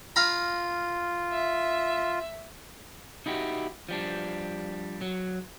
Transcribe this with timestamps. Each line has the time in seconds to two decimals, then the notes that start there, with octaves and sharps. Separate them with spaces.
0.16 F4 F5 A#5 B5
1.32 E5
3.26 D#4 E4 F#4 G4
3.89 F3 G3 D4
5.01 F#3